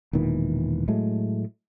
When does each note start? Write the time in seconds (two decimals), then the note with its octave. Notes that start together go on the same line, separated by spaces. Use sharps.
0.13 E1 A#2 D#3 E3
0.88 A2 F#3 G#3 A3